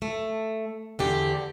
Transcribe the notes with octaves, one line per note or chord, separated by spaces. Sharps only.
A3
E2 D3 G4